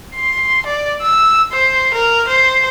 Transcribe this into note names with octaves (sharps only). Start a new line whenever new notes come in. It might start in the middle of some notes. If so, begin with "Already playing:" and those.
C6
D5
E6
C5
A#4
C5